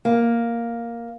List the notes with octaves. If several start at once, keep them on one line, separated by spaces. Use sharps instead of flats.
A#3